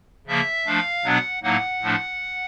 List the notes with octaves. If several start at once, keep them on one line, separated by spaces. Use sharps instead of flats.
C#3 F3 A#3 E5
F3 A3 D4 F5
B2 F#3 B3 D4 F#5
A2 F#3 A#3 D#4 F#5
A2 F3 A3 D4